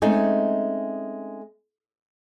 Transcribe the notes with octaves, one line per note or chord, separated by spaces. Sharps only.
G#3 A3 C4 C#4 D#4 G#4